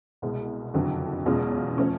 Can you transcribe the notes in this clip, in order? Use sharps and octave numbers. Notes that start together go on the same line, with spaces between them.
C2 B2 G#3
F#1 F2 D3 F#3
E2 B2 G#3 C#4 F4
F3 A3 C#4